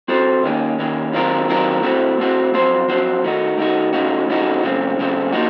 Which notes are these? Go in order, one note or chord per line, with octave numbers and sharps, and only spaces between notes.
F3 C4 F#4 A4 C5
D#2 D#3 A#3 C#4
D#2 D#3 A#3 C#4
D#3 F#3 C4 F4 A#4
D#3 F#3 C4 F4 A#4
A2 A3 C4 F#4
A2 A3 C4 F#4
F#2 F3 C4 F#4 C5
F#2 F3 C4 F#4 C5
D#3 A3 D#4 F#4
D#3 A3 D#4 F#4
F2 C#3 A3 D#4 F#4
F2 C#3 A3 D#4 F#4
F#2 C#3 A3 C4
F#2 C#3 A3 C4
F3 A#3 D#4 F#4